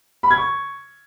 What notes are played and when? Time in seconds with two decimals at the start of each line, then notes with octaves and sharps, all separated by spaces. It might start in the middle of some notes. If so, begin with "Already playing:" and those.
0.23 B5
0.31 G#6
0.38 C#6